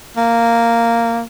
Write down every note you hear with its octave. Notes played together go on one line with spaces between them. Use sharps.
A#3